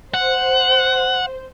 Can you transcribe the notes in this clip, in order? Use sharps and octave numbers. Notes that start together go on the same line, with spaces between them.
C5 F#5